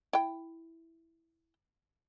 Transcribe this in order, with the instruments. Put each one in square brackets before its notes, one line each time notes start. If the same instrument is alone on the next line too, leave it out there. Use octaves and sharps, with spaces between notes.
[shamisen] E4 G5